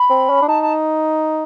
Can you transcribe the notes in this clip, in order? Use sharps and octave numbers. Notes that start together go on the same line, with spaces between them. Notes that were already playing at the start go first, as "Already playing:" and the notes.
Already playing: B5
C4
C#4
D4
D#4 A5
A5